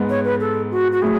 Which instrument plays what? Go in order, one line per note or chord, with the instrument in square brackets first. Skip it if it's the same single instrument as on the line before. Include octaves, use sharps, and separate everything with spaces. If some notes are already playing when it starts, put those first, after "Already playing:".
Already playing: [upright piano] G#2 G#3 B3
[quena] C#5
B4
A4
F#4
F#4
[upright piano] A2 F#3 A3 [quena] G#4